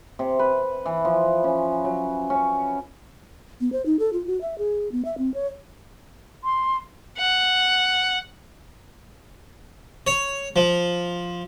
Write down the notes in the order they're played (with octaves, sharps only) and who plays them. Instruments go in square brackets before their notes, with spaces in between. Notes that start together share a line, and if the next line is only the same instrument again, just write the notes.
[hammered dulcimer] C3
B4
E3
F3
C#4
F#3
C#4
[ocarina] B3
C5
D#4
A4
F4
F#4
E5
G#4
B3
E5
C4
C#5
[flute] C6
[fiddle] F#5
[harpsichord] C#5
F3